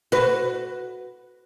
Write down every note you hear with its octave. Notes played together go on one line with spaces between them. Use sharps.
F#4 B4